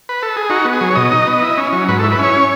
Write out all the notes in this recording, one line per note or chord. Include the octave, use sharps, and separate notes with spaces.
B4
A4
G#4
D#4 F#4
B3
G#4
F#3
C#5
B2 D#5
D#4
B3
E4
C#4
F#3
G#2 B4
A4
E4
B4
C#4 C#5